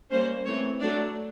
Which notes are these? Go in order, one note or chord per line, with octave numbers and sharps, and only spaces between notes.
G3 A#3 C#4 C5
E3 A3 C4 C#5
F#3 A3 D4 D5